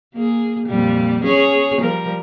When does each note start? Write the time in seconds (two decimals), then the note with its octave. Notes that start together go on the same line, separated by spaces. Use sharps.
0.14 A#3 G#4
0.67 F2 A#2 G3
1.23 C#4 G#4 C#5
1.81 F3 G3 A#4